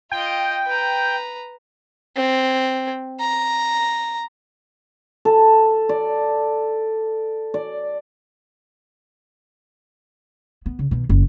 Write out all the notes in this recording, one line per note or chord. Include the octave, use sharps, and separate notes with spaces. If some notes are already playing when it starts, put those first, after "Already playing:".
F4 D#5 G5
B4 A#5
C4
A#5
A4
D5
D5
B3
C#3
B2 D#3
F#1